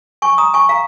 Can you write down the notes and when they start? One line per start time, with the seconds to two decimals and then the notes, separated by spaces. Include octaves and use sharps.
0.22 G#5 C#6
0.38 A#5 D#6
0.54 G#5 C#6
0.69 F5 A#5